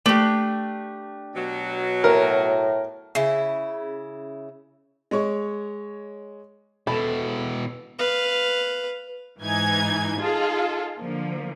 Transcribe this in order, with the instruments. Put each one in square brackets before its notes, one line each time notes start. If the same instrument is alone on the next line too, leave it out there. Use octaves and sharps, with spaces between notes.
[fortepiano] A3 [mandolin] D4 G4
[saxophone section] B2 F#3
[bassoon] A2 [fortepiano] A#4
[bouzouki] C#3 E4
[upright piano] G#3 C#5 C#6
[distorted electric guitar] B2 E4 [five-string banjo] A4 [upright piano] B5
[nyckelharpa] B4 F5
[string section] G#2 E3 D#4 G#5 G#6
D#4 F4 G#4 A4
D3 F3 A#3